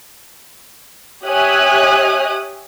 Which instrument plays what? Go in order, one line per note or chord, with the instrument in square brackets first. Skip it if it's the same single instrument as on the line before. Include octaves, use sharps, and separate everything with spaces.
[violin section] G4 C#5 E5 G#5 D#6 F#6